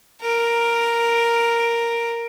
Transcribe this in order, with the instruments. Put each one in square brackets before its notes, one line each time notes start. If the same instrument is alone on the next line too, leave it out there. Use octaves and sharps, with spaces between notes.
[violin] A#4 D7